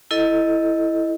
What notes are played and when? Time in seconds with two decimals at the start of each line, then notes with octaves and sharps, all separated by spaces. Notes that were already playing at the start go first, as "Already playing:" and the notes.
0.11 E4 A4 D#5